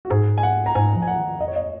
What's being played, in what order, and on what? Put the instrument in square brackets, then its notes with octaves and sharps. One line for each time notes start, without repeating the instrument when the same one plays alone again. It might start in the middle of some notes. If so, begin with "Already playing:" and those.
[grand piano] F#4
[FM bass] G#2 [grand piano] G#4
[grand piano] G#5
F#5
A#5
[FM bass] G#2 [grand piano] G#5
[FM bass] F3
[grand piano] G#5
F#5
[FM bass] D#3
[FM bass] F2 [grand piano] D#5
[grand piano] C#5
D#5